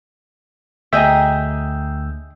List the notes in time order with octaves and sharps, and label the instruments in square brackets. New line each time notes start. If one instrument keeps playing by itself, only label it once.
[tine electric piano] D2 E6 G6 [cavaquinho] G#4 D#5 E5 [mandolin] G5 A#5